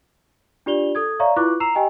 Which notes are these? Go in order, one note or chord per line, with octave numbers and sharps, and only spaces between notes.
D4 F4 G4 D5 F7 G7
A4 D#6 G#6
C#5 D5 E5 F5 A#5 C#6
E4 F4 B4 C#6 D6 F#6
A#5 E6 C7 E7 F7
G4 D#5 G5 G#5